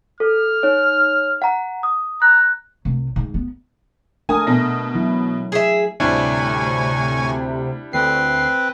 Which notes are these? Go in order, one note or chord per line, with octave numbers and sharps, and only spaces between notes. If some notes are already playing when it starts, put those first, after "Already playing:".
A4 F6
D#4 C#5
F#5 A#5
D#6
A#5 F#6
C2
G#2
B3
A3 D4 A#4 G#5 D#6
B2 A#6
F#3 E4
G#4 E5
D2 A2 C3 G3 D4 E4 G#5 C#6
D2 C4 B4 C7